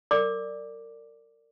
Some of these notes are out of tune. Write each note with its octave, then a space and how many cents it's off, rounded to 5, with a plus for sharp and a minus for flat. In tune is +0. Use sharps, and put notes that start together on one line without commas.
A#4 -30 D5 +0 D6 +0